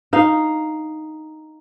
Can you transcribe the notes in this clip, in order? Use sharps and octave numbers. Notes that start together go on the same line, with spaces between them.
D#4 F5